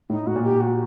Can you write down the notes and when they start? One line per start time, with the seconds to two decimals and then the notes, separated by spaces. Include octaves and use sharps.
0.10 A2 D#4
0.27 A2 F#4
0.36 A#2
0.44 G4
0.61 F#4